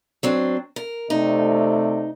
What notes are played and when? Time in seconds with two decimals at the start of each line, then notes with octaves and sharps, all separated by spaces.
0.23 F#3 C4 D4
0.76 A#4
1.10 C3 A3 D#4 D5